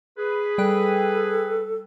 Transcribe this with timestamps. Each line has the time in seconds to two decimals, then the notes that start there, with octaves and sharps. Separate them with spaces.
0.18 G#4 B4
0.58 G3 A4 G5 F#6